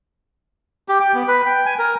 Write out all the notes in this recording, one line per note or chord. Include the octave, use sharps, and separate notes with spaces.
G4
G5
B3
B4
G5
G#5
A#4